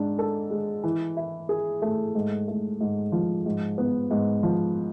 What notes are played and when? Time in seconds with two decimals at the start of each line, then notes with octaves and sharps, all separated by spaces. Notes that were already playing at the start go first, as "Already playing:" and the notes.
Already playing: G#2 D4
0.19 A4
0.51 G#3
0.84 E3
1.17 E4
1.49 G#4
1.82 A3
2.15 G#2
2.48 A3
2.81 G#2
3.12 F3
3.46 G#2
3.78 B3
4.11 G#2
4.43 F3